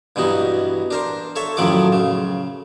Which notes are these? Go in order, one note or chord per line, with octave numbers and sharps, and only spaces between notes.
G2 B2 E3 D#4
D4 A#4 C5
A4 C#5 E5
F#2 A2 D#3 F3 A4 D6
C#3